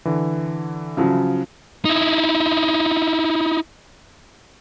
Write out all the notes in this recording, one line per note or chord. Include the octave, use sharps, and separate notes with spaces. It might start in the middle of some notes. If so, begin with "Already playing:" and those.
D3 E3
C#3 F3 F#3
D#4 E4